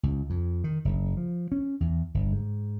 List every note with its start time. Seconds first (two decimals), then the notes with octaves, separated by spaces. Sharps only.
0.03 C#2
0.30 F2
0.64 D#3
0.85 F#1
1.17 F3
1.52 C#4
1.80 E2
2.14 G1
2.32 G#2